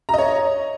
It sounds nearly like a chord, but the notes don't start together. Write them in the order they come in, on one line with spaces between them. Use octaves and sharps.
A#5 D#5 C#5